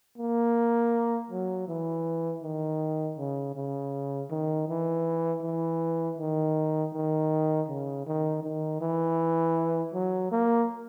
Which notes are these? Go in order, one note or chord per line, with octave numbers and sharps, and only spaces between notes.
A#3
F#3
E3
D#3
C#3
C#3
D#3
E3
E3
D#3
D#3
C#3
D#3
D#3
E3
F#3
A#3